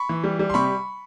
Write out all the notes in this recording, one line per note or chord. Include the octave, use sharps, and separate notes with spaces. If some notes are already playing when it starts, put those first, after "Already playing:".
Already playing: B5 C#6
E3
G3
G3
C6
C3 B5 C#6